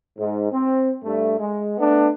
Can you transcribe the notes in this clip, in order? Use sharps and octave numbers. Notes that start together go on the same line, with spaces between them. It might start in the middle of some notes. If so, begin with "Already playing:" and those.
G#2
C4
G2 A3
G#3
A3 B3 D4